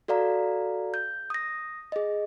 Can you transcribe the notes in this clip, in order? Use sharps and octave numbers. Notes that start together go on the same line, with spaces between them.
F#4 A4 D5 F5 A#5
G6
D#6 A#6
G#4 D#5